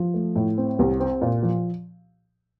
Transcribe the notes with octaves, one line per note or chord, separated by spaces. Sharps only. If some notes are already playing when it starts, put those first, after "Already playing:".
Already playing: F3
A3
A2
C4
C2
C4
A#2
F3